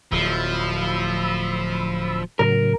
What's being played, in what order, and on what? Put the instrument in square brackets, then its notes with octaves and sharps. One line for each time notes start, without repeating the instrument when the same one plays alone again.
[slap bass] D1 [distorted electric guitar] F3 [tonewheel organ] B5 E6
[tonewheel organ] A2 C#3 F#3 [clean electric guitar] A#4